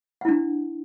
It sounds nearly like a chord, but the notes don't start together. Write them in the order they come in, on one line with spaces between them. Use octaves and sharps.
F#5 E4 D4